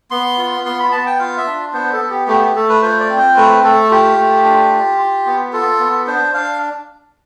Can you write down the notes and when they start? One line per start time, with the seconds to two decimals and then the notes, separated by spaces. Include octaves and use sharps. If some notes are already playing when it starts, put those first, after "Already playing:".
0.11 B3 C6
0.38 F4
0.65 B3 C6
0.80 B5
0.92 B3 A5
1.06 G5
1.19 F4 F5
1.37 E5
1.47 D4
1.73 B3 C5
1.92 A4
2.01 B3
2.10 G4
2.27 A3 G4
2.41 G4
2.55 A3 A4
2.69 B4
2.83 F4 C5
3.00 D5
3.09 C4
3.18 C5
3.36 A3 B4
3.63 A3 A4
3.91 F4 G4
4.17 A3
4.44 D4
4.72 F4
4.98 F4
5.26 B3
5.53 F4 A4
5.79 B3
6.07 D4 C5
6.34 D4 F5